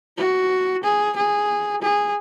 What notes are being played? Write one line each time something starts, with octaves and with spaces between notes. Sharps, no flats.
F#4
G#4
G#4
G#4